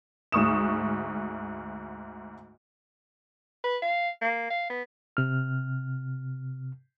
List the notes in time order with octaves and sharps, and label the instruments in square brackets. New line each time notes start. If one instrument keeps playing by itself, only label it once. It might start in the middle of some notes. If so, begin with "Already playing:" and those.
[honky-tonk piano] D2 G#2 C#6 D#6 E7
[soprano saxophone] B4
F5
A#3
F5
B3
[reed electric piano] C3 F6